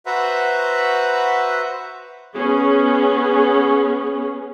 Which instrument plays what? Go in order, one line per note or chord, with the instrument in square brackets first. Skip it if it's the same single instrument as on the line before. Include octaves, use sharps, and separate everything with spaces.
[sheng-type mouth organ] F#4 B4 C5 E5 F#5 A#5
[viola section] B3 C#4 G#4